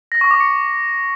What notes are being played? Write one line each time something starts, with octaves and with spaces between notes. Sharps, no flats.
A#6
C#6
D6
C#7